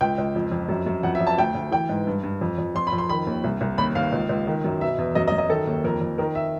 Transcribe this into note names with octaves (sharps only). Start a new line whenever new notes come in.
C#2 G5
C#2
F2
F2
F#2
F#2
F2 F#5
E5
F2
A5
D2 G5
D2
E3 G5
G#2
G2
G2
F2
F2
F2 C6
B5
F2
C6
D#3 B5
D#2
C2
C2
D#2 B5
D#2 F5
C#2
C#2
D#3
F#2
B2 E5
E2
F#2 D#5
D#5
F#2
D#5
D#3 A4
D#2
F2 A#4
F2
D#3 A#4
E5